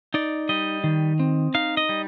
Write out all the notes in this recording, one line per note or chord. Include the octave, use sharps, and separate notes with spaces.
D#4 D5
G3 D#5
D#3
C4
D#4 F5
D#5
G3